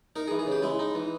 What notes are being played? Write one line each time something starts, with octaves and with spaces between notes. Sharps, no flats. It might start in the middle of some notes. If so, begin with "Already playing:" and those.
D#4 A#4
G#4
E3
G#4
C#3 G4
G#3 E4
D#4
E3